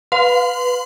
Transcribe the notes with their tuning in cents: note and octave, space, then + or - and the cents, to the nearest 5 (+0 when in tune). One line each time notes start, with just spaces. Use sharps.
B4 +0 F5 +20 C6 -35